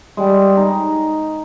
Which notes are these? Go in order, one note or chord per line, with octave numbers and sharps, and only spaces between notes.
G3 G#3
D#4